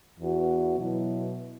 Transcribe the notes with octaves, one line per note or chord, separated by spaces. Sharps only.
E2 E3 B3 F#4
B2 F#3 B3 E4